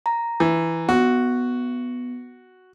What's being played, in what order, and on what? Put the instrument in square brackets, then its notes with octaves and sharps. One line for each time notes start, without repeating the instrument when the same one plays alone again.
[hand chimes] A#5
[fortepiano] E3
[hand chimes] B3 [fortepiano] F#4